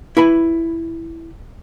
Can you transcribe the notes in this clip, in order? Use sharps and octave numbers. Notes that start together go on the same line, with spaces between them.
E4 B4 B5